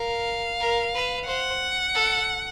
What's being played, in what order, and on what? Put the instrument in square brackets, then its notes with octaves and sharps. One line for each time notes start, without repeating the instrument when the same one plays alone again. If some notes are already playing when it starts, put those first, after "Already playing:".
Already playing: [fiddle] A#4 [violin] F5
[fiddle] A#4
B4
[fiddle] C5 [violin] F#5
[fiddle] A4